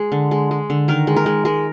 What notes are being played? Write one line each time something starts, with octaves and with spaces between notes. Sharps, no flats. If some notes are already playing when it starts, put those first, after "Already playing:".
Already playing: G#3 G#4
D3
G#3
G#3
D3
D#3 A#4
G#3
A#4
G#3
G#3 A#4